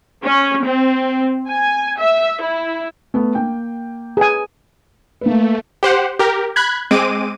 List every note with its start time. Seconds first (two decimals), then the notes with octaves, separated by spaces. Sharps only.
0.23 C#4
0.64 C4
1.48 G#5
1.99 E5
2.41 E4
3.14 A3 B3
3.35 A#3 G5
4.17 G#4 B4 G#5
5.21 A3 A#3 B4
5.83 G4 C5 F#5
6.19 G4 A#4
6.56 B5 F#6 G#6
6.91 G#3 C4 D6 D#7